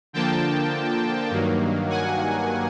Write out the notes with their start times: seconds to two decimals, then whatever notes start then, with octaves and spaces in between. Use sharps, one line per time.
0.13 D3 F3 A#3 G5 A5
1.31 G2 D#3 F#3 A#3
1.90 F#5 G#5